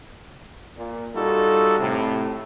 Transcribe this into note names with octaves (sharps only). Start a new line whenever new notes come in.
A#2
G3 D#4 F4 F#4 A4
A2 C3